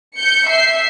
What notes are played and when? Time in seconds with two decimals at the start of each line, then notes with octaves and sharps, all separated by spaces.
0.16 G6 C#7
0.48 E5 C7